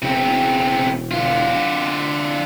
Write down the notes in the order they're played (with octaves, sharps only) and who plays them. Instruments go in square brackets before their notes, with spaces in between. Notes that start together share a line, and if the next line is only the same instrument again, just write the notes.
[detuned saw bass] E1 [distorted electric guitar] C#3 C4
[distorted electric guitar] D3 F4